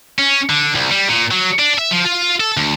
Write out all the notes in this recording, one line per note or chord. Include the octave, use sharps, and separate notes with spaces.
C#4
D3
C2
G3
A#2
F#3
D4
E5
F3
F4
A4
D2